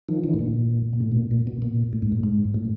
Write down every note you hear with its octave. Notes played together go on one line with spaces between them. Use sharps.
D#3 F3
D3 E3
A2
A#2
A#2
A2
B2
A#2
A#2
B2
A#2
A2
G#2
A2
G#2
A2